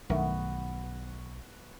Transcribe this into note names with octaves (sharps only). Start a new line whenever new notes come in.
B1 G2 D#3 A3 B3 F#4